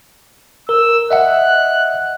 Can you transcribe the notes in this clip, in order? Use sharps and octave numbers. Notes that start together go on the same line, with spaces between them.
A#4 E6
D#5 E5 F#5 F#6